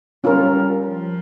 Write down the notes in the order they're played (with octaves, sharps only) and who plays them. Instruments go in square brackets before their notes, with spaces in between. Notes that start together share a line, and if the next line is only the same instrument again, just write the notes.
[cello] G3 [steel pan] C#4 F4 A#4
[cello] F3